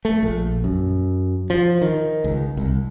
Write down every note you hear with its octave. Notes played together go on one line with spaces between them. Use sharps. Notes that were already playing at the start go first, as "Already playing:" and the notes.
A3
A#1
F#2
F3
D#3
C#2
C2